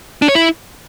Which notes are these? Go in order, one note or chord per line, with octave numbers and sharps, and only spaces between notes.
D4
C#5
E4